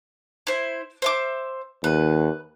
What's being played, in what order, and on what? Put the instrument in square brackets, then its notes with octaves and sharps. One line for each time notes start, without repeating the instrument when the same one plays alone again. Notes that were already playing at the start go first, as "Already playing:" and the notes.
[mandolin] E4 C5
C5 E5 D6
[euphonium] D#2 [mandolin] B4